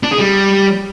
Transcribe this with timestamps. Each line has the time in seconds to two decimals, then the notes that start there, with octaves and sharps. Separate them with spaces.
0.03 D4
0.11 G#4
0.20 G3